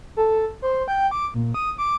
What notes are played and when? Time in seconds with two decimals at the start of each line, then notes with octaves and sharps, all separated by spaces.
0.17 A4
0.62 C5
0.88 G5
1.11 D6
1.34 A#2
1.54 D#6
1.78 D6